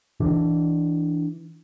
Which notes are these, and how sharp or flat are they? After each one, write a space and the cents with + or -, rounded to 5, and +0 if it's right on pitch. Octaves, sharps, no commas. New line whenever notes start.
E3 +0 D4 +0